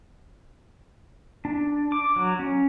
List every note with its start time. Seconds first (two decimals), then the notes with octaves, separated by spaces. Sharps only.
1.45 D4
1.92 D6
2.16 F#3
2.39 C#4